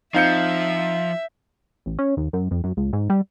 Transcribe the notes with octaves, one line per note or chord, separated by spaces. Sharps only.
F3 C4 D#4 E5 F5 G6 C#7
A1
C#4
D#2
F#2
F2
F#2
C#2
G#2
G3